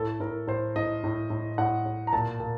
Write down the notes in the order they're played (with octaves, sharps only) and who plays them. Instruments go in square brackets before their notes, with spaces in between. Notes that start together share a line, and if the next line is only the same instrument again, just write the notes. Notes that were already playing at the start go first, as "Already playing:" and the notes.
Already playing: [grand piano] A2 A4
A2 A#4
A2 C5
A2 D#5
A2
A2
A2 F#5
A2
A#5
A#2 A5
A#2